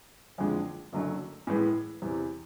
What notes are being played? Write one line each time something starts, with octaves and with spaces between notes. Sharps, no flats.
F#1 F2 D3 F3 G#3
F#1 F#2 D3 F#3 A3
A2 E3 G#3 B3
E2 C3 E3